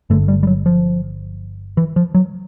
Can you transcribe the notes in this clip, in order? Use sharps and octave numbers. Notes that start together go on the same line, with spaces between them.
G1 G2 D3 A3
G3
G3
F#3
F3
E3
F3
F#3